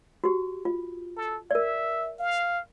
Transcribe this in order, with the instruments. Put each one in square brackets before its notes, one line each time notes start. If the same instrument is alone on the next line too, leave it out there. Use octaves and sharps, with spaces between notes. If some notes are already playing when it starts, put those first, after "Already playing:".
[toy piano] F#4 G4
F4
[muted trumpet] A4
[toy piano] A#4 D5 [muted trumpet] E5
[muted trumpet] F5